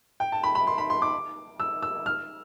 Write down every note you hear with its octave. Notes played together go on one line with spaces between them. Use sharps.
G5
A5
B5
B5
C6
B5
C6
D6
E6
E6
F6